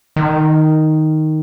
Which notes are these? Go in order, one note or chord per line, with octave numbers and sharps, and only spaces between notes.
D#3